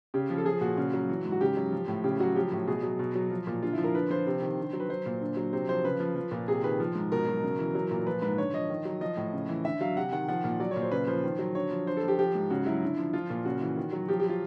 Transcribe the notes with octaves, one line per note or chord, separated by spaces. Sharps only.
C#3 G4
F3
A4
F3 G#4
A#2 F#4
C#3
F#3
E3
G#2
F#4
C#3 G4
F#3
F3
A2
C#3 G4
F#3 F#4
F3 G4
A2
B2 G#4
F#3
B2
F#3
F3
A#2
D3 F4
E4
F3
A#4
D3 B4
F3 C5
C3
D#3
D3
F#3
B4
F#3 C5
A#2
D3
F#3
C3 C5
F3 C5
C#3 B4
F3
F3
A#2
C3 G#4
D#3 B4
F3
G#2
B2 A#4
F#3
C#3
E3
F#3
A#2
F3 B4
G#2 B4
D3 C#5
F3 D#5
D#3
F#3
F3 D#5
A2
C#3
E3
D3 E5
F#3 F5
C3 F#5
D#3 F#5
F3 F#5
A#2
F#3 D5
C#5
A#2
C5
C#3 B4
F3 C5
D#3
F#3
D3 C#5
F3
D3 C5
A4
F3
G4
F3 G4
G#2
C#3 F#4
F#3 E4
D3
F3
F3 F4
A#2
C#3 F#4
E3
D#3
F#3
F3 G4
G4
F4